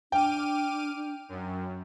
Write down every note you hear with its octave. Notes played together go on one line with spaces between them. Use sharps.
D4 G5 D6 F6 D#7
F#2